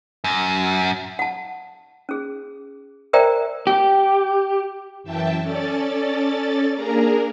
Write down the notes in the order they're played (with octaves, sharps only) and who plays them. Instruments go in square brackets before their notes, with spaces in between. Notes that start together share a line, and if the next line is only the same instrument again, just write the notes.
[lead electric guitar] F#2
[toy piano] F#5 A5
C#4 G#4
A#4 C5 D5 E5 G5 A#5
[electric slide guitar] G4
[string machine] F#2 E3 E5 G5 A5
C#4 A4 D5 A6
A#3 D4 G#4 A#4 A#5